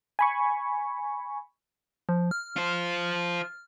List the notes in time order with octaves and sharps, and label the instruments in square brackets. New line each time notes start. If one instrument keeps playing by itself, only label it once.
[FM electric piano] G#5 B5 C#6
[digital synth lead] F3
F6
[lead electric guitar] F4 C5